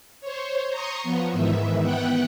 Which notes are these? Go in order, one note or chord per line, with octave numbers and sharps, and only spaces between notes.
C5 C#5
A#5 C6 C#6 D#6
F3 B3
G#2 D#3 E3 E5
B3 F#5 G5 F#6